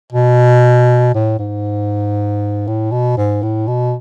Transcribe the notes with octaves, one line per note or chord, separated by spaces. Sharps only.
B2
A2
G#2
A2
B2
G#2
A2
B2